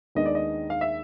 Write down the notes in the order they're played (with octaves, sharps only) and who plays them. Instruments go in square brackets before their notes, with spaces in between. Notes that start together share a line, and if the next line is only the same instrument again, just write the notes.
[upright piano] D#2 D#3 G#3 B3 D4 [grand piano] D#5
[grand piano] D5
D#5
F5
E5